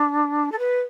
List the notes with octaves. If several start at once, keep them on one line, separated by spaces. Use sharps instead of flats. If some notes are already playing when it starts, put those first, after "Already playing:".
Already playing: D4
A4
B4